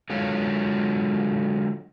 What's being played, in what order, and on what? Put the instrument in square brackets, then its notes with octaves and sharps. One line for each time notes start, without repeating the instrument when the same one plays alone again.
[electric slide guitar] D3 F#3 G#3 F4 A4 C#5